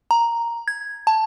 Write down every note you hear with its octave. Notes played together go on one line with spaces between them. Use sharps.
A#5
G#6
A5